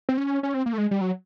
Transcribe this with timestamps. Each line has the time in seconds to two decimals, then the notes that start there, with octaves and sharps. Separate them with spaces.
0.09 C4
0.17 C#4
0.43 C#4
0.54 C4
0.66 A#3
0.73 A3
0.78 G#3
0.91 G3
1.01 F#3